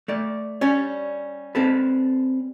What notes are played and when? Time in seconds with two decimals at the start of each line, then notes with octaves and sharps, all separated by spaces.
0.08 A3 D5
0.61 G3 C#4 C#5
1.55 C4 A4 B4